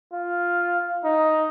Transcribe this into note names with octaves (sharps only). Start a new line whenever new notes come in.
F4
D#4